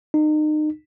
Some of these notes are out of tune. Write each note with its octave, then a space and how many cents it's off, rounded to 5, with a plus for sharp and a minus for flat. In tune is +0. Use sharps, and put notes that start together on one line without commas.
D#4 -30